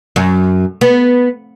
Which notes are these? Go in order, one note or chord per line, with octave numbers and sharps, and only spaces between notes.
F#2
B3